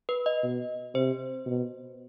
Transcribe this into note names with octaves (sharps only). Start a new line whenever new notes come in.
B4
D#5
B2
C3 C5
B2